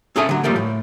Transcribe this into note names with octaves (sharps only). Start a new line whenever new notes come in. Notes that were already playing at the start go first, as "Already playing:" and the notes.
C4 C#4 G#4 A4 E5 G#5
D3 F#3
A#2 F3 G3 A3 A#3 C4
A2